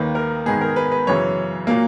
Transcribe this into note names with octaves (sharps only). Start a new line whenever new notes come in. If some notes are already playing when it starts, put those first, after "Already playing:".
Already playing: D#2 D#3 A#3 B4
A#4
G#2 D#3 G#3 B3 G#4
A#4
B4
B4
F#2 C#3 E3 C#5
A#2 F#3 A#3